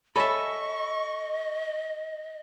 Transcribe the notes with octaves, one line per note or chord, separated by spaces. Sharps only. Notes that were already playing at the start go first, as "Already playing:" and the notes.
A4 C#5 D#5 E5 G#5 B5 C#6